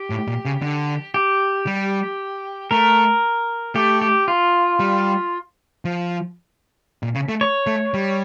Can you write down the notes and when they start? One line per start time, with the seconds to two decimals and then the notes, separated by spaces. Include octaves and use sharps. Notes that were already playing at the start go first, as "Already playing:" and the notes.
Already playing: G4
0.10 A2
0.27 A#2
0.45 C#3
0.62 D3
1.14 G4
1.67 G3
2.71 A3 A#4
3.75 A3 G4
4.01 G4
4.28 F4
4.80 G3
5.85 F3
7.03 A#2
7.15 C#3
7.29 A3
7.41 C#5
7.67 A3
7.94 G3